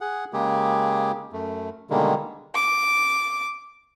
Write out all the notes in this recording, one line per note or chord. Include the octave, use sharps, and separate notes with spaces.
G#4 F#5
C#3 G#3 A#3 G4 G#4
F#2 A3
B2 D3 D#3 G3 G#3 A#3
D6